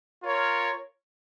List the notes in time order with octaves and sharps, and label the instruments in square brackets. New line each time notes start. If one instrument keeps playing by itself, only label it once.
[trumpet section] F4 A#4 C#5